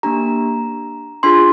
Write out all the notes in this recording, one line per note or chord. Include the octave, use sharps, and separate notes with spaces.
A#3 D4 G4 A#5
D4 F4 G#4 C6